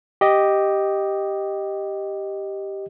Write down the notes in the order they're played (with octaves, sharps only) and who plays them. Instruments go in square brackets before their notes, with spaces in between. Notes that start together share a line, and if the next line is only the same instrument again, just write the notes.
[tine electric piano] G4 D#5